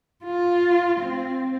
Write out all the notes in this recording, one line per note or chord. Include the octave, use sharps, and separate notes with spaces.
F4
C4